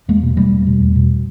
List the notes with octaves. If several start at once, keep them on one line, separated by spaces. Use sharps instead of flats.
E2 G#3 A#3
B2
B2 G3 A3
E2
B2
E2
B2